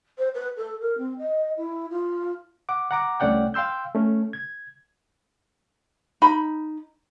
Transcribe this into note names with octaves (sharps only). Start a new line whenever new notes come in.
C5
B4
A4
A#4
C4
D#5
E4
F4
F#5 D6
F#5 A#5 D6
C2 A3 C#4 D5 F#5 G5
F5 G5 C6 E6 G6
A3 C#4
G#6
D#4 B5